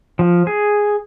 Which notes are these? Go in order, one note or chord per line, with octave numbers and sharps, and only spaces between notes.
F3
G#4